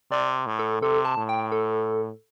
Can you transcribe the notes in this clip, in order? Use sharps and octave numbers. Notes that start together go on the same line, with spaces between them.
C3 D5
A2
A4
C3 A4
A5
A2
G5
A4